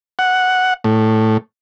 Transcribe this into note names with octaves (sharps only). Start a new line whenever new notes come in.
F#5
A2